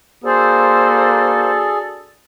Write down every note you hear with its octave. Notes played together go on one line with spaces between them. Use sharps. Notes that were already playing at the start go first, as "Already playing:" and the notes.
A#3 D4 F#4 G#4 A4 C5